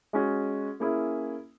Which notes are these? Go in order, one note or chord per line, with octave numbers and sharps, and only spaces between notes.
G#3 C#4 F#4
A#3 C#4 E4 G#4